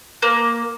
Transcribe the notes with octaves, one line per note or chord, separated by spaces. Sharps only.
A#3